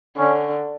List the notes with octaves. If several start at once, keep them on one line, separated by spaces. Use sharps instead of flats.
D3 C#4